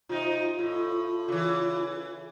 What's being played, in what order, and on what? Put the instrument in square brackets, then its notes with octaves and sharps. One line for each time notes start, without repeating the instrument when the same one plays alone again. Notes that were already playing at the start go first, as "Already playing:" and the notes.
[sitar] C3 D#4 [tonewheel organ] F4
[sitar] A2
C#3 E3